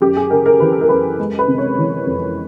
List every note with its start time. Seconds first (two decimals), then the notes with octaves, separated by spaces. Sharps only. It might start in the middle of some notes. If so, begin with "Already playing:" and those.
0.01 F#2 G4
0.17 G#4
0.30 C#3 A#4
0.46 A#4
0.60 E3 B4
0.72 A4
0.81 A#4
0.89 F#2 B4
1.19 G#3
1.39 B4
1.48 C3
1.58 C#5
1.78 E3
2.06 F2